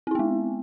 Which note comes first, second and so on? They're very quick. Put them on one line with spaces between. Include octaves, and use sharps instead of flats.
C4 E4 B3 G#3